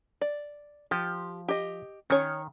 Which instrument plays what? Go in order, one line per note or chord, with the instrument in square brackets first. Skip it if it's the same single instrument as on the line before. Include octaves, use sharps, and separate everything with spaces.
[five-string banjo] D5
[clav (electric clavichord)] F3 [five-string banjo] G4
[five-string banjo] G4 D#5
[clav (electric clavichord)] D#3 [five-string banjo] C#4 C#5